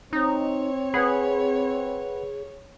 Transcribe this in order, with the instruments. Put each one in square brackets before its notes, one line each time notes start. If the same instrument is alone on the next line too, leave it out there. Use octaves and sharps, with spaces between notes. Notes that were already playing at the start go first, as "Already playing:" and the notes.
[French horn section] C4 [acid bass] D#4 [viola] C#5
[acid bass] G#4 [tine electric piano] B4 F#5 B5